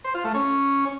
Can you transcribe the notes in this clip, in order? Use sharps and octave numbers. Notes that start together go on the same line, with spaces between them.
C5
F4
A3
C#4